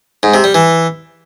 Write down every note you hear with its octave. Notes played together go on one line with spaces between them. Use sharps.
G#2
C3
G3
E3